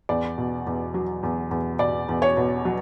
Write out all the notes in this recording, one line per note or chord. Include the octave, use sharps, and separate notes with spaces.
E2 D5
B2
E2
F#3
E2
E2
B2 D5
E2
C#5
B2
F#3